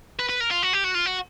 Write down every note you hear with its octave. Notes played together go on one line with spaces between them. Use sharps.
B4
B4
A#4
F4
F#4
G4
F#4
F4
F#4